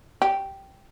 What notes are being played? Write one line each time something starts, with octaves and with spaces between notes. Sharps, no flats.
G4